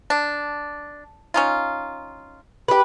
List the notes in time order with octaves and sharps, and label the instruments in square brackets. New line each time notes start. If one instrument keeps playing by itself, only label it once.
[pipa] D4
C#4 D#4 F4
[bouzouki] G4 B4